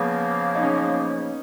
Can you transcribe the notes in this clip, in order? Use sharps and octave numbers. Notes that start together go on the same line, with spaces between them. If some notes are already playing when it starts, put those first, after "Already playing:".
Already playing: C#3 F3 A#3 B3
D#4
C#4